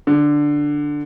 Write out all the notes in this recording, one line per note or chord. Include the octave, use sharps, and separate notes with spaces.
D3